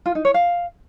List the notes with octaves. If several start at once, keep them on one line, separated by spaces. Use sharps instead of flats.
F4
D#4
C#5
F5